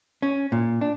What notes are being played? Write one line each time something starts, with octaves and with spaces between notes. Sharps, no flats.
C#4
A#2
D4